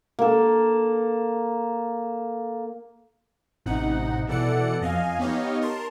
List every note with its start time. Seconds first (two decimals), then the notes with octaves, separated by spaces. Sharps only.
0.19 A#3 A4
3.66 A1 C3 D#4 F#5
4.27 B2 E3 A4 D5 F#5 C#7
4.81 F2 D#5 F5 G#5
5.19 B3 D#4 G4 C#5 D#5 F5
5.61 A#4 A5 C6